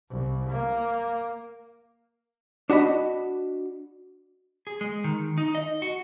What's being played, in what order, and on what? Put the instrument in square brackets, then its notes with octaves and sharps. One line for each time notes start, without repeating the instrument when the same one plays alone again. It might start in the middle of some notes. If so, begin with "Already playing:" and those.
[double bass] C2
A#3
[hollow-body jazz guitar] D4 F#4 D#5 B5
[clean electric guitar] G#4
G#3
D#3
D#4
D#5
F#4